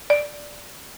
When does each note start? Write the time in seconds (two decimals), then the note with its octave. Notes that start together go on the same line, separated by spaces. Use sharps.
0.10 D5